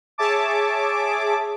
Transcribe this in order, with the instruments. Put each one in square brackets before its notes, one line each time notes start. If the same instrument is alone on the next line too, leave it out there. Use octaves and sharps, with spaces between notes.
[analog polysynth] G#4 C#5 E5 A5 D6